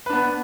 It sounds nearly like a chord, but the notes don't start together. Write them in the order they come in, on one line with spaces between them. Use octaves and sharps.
B4 D4 B3